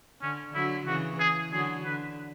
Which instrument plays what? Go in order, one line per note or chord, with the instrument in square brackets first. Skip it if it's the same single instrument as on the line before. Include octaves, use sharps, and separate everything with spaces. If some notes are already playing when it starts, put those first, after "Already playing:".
[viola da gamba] D3 [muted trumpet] C#4
[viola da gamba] D3 F#3 [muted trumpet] E4
[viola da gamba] C#3 E3 [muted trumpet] F#4
[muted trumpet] G#4
[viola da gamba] D3 F#3 [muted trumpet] G#4
[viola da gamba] D3 [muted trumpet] B4